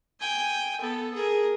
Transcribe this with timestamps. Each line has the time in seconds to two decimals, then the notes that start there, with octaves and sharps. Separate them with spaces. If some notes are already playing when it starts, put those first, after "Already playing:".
0.20 G5 G#5
0.81 B3 A4
1.14 G#4 A#4